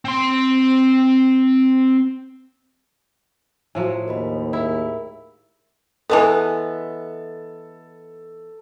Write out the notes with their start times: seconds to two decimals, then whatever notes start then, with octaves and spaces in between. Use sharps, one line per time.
0.05 C4 C6
3.75 A2 F3 F#3 G#5
4.08 D#2 A#4 D#5 B5
4.53 E4 G#4 A#4 B5
6.10 E3 G#3 B3 A4 A5